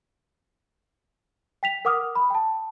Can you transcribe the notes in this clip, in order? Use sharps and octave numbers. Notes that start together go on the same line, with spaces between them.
G5 B6 F7
A#4 F#5 D6 D#6 F6
B5
G5 A5